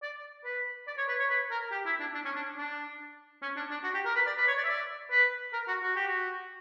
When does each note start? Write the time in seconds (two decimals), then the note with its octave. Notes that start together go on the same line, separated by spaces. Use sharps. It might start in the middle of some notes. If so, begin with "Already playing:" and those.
0.02 D5
0.45 B4
0.88 D5
0.98 C#5
1.09 B4
1.19 C#5
1.29 B4
1.51 A#4
1.72 G4
1.86 E4
2.00 D4
2.15 D4
2.25 C#4
2.36 D4
2.57 D4
3.42 C#4
3.56 D4
3.70 D4
3.84 F#4
3.94 G4
4.05 A#4
4.15 B4
4.27 D5
4.37 B4
4.47 C#5
4.58 D5
4.64 E5
4.69 D5
5.11 B4
5.53 A#4
5.68 F#4
5.83 F#4
5.96 G4
6.08 F#4